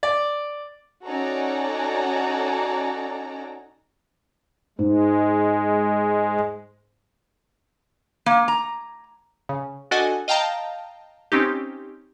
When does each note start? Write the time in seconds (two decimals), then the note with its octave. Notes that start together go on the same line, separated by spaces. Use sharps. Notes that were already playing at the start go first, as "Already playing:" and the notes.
0.03 D5
1.06 C#4 D#4 F#4 A4 D5 A#5
4.79 G#2 G#3
8.26 A#3
8.48 A#5
9.49 C#3
9.91 D4 F#4 A4 D#5 F#5 G#5
10.28 D#5 F5 G5 A5 A#5
11.32 C4 C#4 D#4 G4